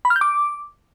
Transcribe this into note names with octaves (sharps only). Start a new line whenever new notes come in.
B5
F6
G6
D6